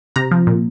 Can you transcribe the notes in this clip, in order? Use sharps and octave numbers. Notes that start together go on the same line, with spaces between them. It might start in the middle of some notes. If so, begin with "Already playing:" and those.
C3 A#5
F3
A#2